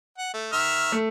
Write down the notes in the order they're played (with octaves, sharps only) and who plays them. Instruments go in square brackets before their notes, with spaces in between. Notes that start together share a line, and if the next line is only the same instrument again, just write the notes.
[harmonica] F#5
A3
D#3 E5 F6
[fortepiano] A3